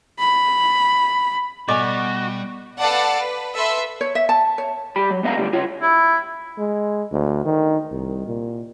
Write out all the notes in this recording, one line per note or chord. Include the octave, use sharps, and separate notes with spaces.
B5
B2 G3 F#4 A4 D5 D#5 G#5 D6
A4 B4 D5 F5 F#5 A5
B4
A4 B4 E5 C6
C#5
E5
A5
C#5
G3 B5
F#3
G#3 B3 D#5 F5 A#5
D2 D3 G3
C#3 F4 C#5
E4
G#3
D2
D#3
C2
A#2